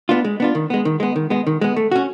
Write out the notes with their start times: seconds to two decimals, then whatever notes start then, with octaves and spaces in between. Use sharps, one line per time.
0.09 B3 D4 F4
0.25 G#3
0.40 B3 D4 F4
0.55 D#3
0.70 G#3 B3
0.85 D#3
1.00 G#3 B3
1.16 D#3
1.30 G#3 B3
1.47 D#3
1.61 G#3 B3
1.76 A3
1.92 C#4 F#4